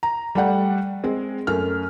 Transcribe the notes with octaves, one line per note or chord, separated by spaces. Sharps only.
A#5
G3 A3 D5 F#5 G5
G#3 C4
F#2 A3 F6